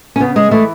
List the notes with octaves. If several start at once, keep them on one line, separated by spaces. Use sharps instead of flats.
C#4
C#3 B3
G#3
E3 G#3 A3